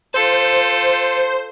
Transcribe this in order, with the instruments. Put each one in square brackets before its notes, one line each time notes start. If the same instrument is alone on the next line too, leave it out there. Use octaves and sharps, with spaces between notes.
[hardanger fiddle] F4 A4 [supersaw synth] C5